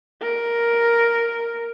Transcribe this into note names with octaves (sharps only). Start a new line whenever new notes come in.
A#4